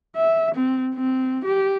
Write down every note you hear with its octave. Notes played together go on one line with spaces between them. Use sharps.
E5
C4
C4
G4